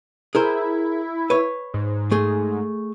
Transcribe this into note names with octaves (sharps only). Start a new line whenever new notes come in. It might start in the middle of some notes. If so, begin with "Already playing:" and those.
E4 G#4 A#4 C5
B4 C#5
G#2
A3 G#4